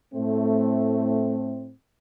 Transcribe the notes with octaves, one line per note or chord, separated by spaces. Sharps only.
A2 A3 C4